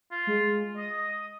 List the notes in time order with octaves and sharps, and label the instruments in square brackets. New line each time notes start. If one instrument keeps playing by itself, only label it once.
[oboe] F4
[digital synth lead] G#3
[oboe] D#5 [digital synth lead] D#6